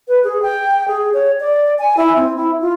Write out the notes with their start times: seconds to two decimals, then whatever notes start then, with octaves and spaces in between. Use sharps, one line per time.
0.08 B4
0.24 G#4
0.42 G5
0.88 G#4
1.14 C#5
1.40 D5
1.79 G#5
1.97 E4
2.16 C4
2.36 E4
2.61 F4